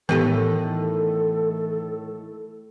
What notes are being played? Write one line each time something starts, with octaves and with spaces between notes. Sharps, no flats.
A2 D#3 E3 A3 B3 G4 A4